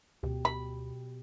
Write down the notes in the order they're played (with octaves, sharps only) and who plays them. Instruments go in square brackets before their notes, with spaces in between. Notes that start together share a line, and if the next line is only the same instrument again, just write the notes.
[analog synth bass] D2 [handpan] B2 G4
[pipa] B5